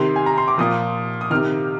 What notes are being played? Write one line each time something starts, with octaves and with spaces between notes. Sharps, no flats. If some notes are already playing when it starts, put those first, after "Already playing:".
Already playing: C3 D#3 C6
G#5
A#5
C6
D6
A#2 F3 D#6
D#6
C3 D#3 F6